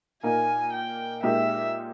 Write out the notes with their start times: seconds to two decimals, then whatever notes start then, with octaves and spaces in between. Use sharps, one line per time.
0.23 A#2 A#3 D#4 A#4 G#5
0.73 G5
1.23 A#2 G#3 D#4 G4 A#4 E5